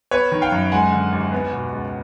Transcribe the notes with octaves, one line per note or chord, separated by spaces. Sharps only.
B3 B4 C#5
D#3
F5 G5
F#2
G#3 F#5 G#5
D3
D#2
B3
B2
C#2